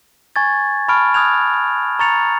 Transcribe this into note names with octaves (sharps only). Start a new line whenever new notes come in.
G#5 C#6 G#6 A6
A5 B5 C#6 F6 D7
D#6 F6 F#6 G#6 F7
A#5 C#6 A6 C#7 F7